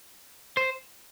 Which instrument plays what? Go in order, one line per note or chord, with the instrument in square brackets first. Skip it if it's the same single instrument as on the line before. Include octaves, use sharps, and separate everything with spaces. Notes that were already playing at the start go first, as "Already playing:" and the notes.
[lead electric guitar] C5